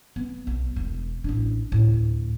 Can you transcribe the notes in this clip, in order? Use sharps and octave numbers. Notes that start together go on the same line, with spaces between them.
B3
B1
E1
A1 D4
D2 A2